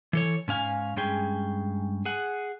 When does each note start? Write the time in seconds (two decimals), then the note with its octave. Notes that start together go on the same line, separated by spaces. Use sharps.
0.13 E3 A4 C#5
0.48 G#2 C#4 F5 G#5
0.96 G2 G#3 C#4 G#4 G5
2.05 G#4 F#5